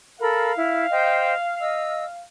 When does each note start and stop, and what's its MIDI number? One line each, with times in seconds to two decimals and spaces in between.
0.20 0.52 69
0.20 0.52 70
0.20 2.24 77
0.20 0.52 83
0.56 0.87 64
0.91 1.34 72
0.91 1.34 75
0.91 1.34 79
1.61 2.05 75
1.61 2.05 88